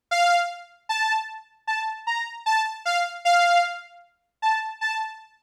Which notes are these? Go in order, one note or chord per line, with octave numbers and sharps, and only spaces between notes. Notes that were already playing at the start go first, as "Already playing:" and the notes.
F5
A5
A5
A#5
A5
F5
F5
A5
A5